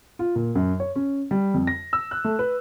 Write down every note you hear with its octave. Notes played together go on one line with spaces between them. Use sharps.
F4
A#2
F#2
C#5
C#4
G3
F2
A#6
E6
F#6
A3
B4